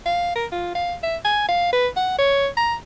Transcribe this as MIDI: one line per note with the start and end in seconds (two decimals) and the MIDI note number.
0.06 0.35 77
0.35 0.46 70
0.52 0.72 65
0.75 0.95 77
1.03 1.16 76
1.25 1.44 80
1.48 1.72 77
1.73 1.88 71
1.96 2.17 78
2.18 2.48 73
2.57 2.75 82